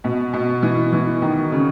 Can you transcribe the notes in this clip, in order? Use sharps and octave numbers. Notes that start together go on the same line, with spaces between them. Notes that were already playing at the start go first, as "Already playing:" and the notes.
B2
B2
E3
E3
D#3
C#3